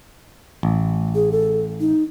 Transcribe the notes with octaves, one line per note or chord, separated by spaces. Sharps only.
A1
G#4
A4
D#4